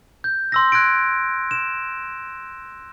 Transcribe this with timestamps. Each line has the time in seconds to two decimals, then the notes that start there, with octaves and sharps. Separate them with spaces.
0.24 G6
0.52 C6 E6 A#6
0.72 F#6 G#6 A#6 D7
1.51 D7 E7